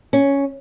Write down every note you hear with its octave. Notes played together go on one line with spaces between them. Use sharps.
C#4